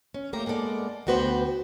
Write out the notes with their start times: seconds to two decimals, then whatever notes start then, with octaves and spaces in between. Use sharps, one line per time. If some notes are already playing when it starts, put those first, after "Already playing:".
0.14 C#4
0.33 A3 A#3 G4 A#5
0.46 G#3 A#3 B3 A4 D5
1.07 D2 B3 F#4 B4 C5 G5